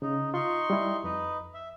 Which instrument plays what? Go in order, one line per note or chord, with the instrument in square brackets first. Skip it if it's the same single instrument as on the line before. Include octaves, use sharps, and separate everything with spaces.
[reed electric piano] C#3 [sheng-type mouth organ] D#4
[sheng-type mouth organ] D#4 C6 C#6 [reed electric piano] F4
[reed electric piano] G3 E4
[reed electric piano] F2 [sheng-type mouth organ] D#4 B4
[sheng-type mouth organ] E5